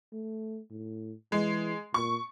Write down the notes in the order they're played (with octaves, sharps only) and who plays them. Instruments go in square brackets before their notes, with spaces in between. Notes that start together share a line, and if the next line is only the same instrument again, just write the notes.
[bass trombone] A3
A2
[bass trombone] E3 [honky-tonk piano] G#3
[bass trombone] A#2 [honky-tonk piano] C#6